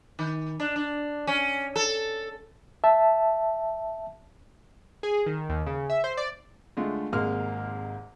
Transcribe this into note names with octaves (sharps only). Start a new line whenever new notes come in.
D#3
D4
D4
C#4
A4
E5 A5
G#4
D#3
D#2
C#3
E5
C5
D5
D3 G#3 A3 F4
G#1 C3 G#3 A#3 F6